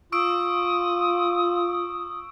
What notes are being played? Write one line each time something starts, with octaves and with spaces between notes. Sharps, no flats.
F4 C#6 D#6 E6 D7